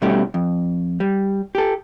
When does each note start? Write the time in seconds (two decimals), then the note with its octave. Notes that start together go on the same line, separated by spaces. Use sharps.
0.02 B2 G3 A3 C#4 E4 G4
0.34 F2
1.00 G3
1.55 G4 A4